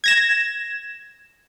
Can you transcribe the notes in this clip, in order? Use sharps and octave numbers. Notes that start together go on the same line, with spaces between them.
G#6 A#6 E7